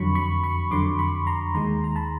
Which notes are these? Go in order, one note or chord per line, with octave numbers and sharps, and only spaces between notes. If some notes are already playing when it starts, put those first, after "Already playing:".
Already playing: F2 D3 F#3 B5 C#6
B5 C#6
B5 C#6
F2 D3 F#3 C6 D6
B5 C#6
A#5 C6
D#2 D#3 G#3 A#5 C6
A#5
A5 B5